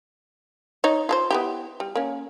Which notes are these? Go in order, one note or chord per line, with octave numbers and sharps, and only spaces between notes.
D#4 C#5
F4 A4 C5
B3 E4 G4
G3
A#3 C#4